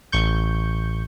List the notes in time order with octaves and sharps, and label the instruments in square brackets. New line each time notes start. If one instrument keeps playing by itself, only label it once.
[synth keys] A1 C#6 G6